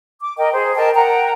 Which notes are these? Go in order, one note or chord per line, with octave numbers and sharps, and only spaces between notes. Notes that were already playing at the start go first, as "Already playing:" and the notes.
D6
A#4 D#5 G5
G#4 C5
A#4 D#5 G5 A5
A#4 F#5 G5 A#5